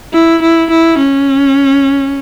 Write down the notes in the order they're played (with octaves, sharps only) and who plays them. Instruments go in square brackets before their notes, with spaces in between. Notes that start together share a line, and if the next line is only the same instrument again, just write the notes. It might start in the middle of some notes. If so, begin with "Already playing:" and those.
[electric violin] E4
E4
E4
C#4